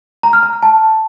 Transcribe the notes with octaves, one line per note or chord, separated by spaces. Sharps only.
A#5
F6
A#5
F6
A5